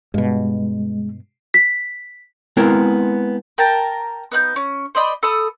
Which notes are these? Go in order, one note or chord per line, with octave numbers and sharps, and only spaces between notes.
G2 B2 G#3
B6
G#3 B3 C4 E4 A#4 A#5
A#4 G5 A5 A#5
B3 D#4 F#6 G6
C#4
C5 D5 D#5 B5
A4 B5 D#6